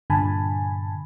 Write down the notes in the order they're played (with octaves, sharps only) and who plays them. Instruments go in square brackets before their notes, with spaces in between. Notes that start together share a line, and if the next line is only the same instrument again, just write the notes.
[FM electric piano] G2 A#2 D3 G#5 A5 B5